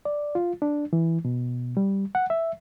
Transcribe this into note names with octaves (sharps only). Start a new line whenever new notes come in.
D5
F4
D4
E3
B2
G3
F#5
E5